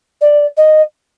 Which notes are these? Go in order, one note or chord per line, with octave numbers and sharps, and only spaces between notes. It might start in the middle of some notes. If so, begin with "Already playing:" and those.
D5
D#5